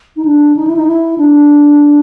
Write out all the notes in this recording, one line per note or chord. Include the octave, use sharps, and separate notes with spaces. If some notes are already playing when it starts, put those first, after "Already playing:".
D#4
D4
D#4
E4
D#4
E4
D4